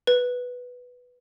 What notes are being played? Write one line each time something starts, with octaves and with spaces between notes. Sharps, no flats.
B4